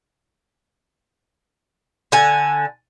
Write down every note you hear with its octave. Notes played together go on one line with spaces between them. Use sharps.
D3 F#5 G#5